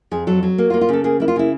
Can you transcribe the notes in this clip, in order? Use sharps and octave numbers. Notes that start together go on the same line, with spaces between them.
F2 G#4
F#3 A4
F#3
A#3 F#4
F4
A#3
F4
C#3 A4
A#3 G#4
A#3 E4
F4
C#3 E4